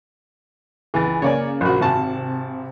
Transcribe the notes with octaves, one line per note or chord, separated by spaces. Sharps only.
C#2 E3 G#5 A6
C#3 A#3 C#5 D5 G#5
A#1 F#4
G#1 C3 F#4 A5